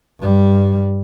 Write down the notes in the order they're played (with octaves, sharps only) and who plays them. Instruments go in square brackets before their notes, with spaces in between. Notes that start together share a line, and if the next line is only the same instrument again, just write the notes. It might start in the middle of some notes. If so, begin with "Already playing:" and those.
[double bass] G2 G3